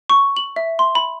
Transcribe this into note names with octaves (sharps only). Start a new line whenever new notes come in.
C#6
F#7
E5
C6
B5